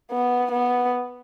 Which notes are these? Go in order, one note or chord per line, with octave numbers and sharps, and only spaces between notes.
B3
B3